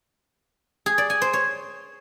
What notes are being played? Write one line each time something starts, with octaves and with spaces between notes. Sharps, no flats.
G#4
D5
G#5
C5
C#5